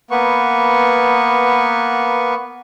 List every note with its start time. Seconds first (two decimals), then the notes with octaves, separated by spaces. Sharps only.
0.11 A#3 B3 B4 C#6